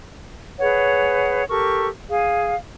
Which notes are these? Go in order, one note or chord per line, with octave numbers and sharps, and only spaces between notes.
G#4 B4 C#5 F#5
G4 A4 A#4 C#6
G#4 F5